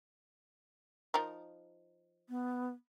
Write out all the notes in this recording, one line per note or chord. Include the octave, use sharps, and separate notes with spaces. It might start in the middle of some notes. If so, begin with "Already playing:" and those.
F3 D#4 A#4
B3